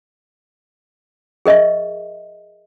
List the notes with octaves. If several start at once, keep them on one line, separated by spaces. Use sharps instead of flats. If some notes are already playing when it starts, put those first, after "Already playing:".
G#4 A#4 D#5 E5 C#6